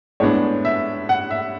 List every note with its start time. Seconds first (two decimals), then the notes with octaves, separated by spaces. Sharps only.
0.20 A2 G#3 B3 D4 C#5
0.65 E5
1.09 F#5
1.30 E5